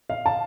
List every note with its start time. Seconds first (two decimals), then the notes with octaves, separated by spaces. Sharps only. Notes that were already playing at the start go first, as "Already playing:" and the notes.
0.10 F5
0.26 A5